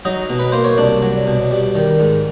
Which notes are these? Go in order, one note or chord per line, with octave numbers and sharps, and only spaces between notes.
F#3 D#4 D#5
B2
B4
A#3 C5
C#5
C2 D4 D5
F#3
B2
G3
D#3
G#2